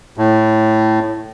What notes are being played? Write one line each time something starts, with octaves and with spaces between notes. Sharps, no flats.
A2